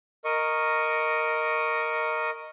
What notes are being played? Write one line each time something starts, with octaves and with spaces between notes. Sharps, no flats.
A#4 D#5 C#6